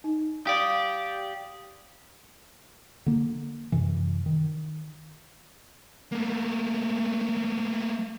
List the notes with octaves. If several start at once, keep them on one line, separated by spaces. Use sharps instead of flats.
D#4
G4 D5 F5 D#6
D3 A#3
F#2 C3 E3
D#3
A3 A#3